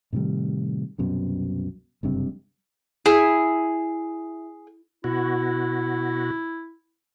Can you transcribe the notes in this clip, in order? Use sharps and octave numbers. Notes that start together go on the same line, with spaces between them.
A2 C3 D#3 G3
C2 F#2 B2
F#1 G2 C3
E4 G#4
B2 E4 F#4